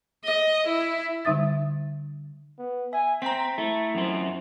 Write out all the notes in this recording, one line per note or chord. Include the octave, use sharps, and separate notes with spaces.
D#5
E4
D3 G3 D#4 E5 D#6 A6
B3
E5 G#5
C4 G5 A#5 B6
A3 E4
F#2 C4